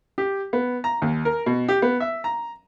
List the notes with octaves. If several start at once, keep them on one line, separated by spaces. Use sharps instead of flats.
G4
B3
A#5
D#2
A#4
B2
G4
B3
E5
A#5